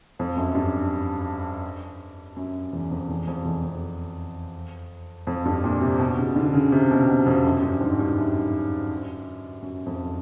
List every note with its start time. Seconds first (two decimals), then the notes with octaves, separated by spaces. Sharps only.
0.19 F2
0.36 F#2
0.55 G2
2.36 F#2
2.73 E2
2.91 F2
3.09 E2
3.27 F2
3.45 E2
3.64 F2
5.27 F2
5.45 G2
5.64 A#2
5.81 C3
5.99 B2
6.18 C#3
6.36 D3
6.54 C#3
6.72 C3
6.91 B2
7.08 B2
7.26 F2
7.45 F#2
7.62 G2
7.81 G#2
7.99 G2
8.18 F#2
9.62 F#2
9.86 F2